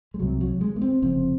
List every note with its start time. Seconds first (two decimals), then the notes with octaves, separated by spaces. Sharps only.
0.14 G#3
0.20 C2 C3 F#3
0.41 F#3
0.61 G#3
0.76 A#3
0.82 C4
1.02 F1 F2 C#3 C4